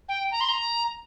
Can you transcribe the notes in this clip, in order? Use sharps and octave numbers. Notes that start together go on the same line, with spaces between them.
G5
A#5
C6
A#5